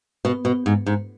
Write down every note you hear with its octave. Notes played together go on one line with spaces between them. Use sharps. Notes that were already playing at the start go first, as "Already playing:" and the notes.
B2
B2
G#2
G#2